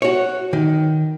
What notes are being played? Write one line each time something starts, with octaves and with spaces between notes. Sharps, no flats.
F#4 C#5
D#3